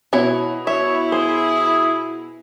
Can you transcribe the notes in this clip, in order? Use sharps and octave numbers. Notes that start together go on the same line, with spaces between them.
B2 E4 C#5
E4 C#5 E5
G#4 C5